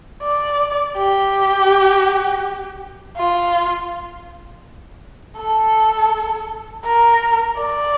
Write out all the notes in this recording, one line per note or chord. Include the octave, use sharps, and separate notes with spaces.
D5
G4
F4
A4
A#4
D5